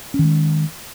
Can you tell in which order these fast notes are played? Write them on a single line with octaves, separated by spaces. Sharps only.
C#4 D#3 G#3